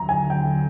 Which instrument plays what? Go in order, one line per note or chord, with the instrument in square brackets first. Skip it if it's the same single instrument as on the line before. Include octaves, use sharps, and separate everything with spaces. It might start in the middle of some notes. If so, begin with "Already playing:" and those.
Already playing: [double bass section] D#2 D3 F#3 [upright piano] A#5
[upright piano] G#5
G5